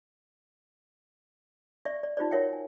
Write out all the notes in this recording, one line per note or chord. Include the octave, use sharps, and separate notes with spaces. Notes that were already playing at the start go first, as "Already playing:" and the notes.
D5 E5 C#6
D5
D#4 F4 G4 C5 D5
F#4 A#4 C#5 E5 F#5 G5
G#5